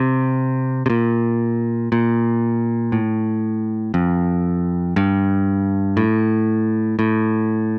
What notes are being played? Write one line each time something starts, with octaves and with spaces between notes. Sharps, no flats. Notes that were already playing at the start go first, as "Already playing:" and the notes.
Already playing: C3
C3
A#2
A#2
A2
F2
G2
A2
A2